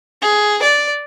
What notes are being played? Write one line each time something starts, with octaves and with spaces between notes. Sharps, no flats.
G#4
D5